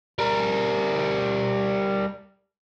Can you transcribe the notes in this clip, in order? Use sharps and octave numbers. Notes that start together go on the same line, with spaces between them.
G3 A#4